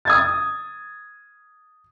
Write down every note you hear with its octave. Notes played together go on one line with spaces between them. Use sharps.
D#6 G#6 A6